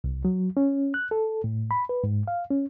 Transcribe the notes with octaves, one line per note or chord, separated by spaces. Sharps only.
C2
F#3
C#4
F#6
A4
A2
B5
B4
G#2
F5
C#4